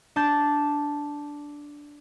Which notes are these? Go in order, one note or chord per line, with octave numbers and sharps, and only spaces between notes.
D4 A5 G6